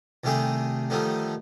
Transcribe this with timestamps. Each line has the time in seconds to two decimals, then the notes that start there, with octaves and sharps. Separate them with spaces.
0.24 C2 D#3 A3 G4 G#4 D#6
0.90 D3 D#3 F3 G3 A3 D#4